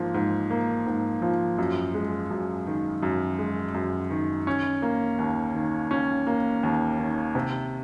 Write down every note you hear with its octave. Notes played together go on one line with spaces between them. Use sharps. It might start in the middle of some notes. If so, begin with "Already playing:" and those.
Already playing: G#2 F3 A#3
G#2
A#3
G#2
F3
F#2
G#3
F#2
D#3
F#2
G#3
F#2
D#3
C#4
A#3
D#2
D#3
C#4
A#3
D#2
D#3
C3